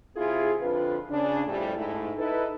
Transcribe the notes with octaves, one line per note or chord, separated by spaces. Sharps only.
C3 E4 F4 G#4
F2 D3 F4 B4
C#3 D4
F2 A2 G3
G#2 A3 E4
D#4 E4 A4 B4